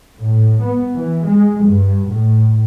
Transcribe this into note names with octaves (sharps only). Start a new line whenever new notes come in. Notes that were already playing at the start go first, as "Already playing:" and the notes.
A2
B3
E3
G#3
G2
A2